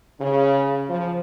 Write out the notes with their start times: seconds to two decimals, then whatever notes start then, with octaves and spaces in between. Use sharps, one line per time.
0.20 C#3
0.89 F3